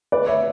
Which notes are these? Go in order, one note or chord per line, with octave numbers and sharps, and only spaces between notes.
B4 D5
C#5 E5